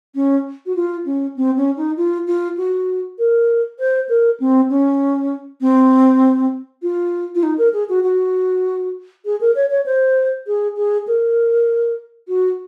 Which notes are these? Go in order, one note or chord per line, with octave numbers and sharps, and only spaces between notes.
C#4
F#4
F4
C#4
C4
C#4
D#4
F4
F4
F#4
A#4
C5
A#4
C4
C#4
C4
F4
F4
D#4
A#4
G#4
F#4
F#4
G#4
A#4
C#5
C#5
C5
G#4
G#4
A#4
F#4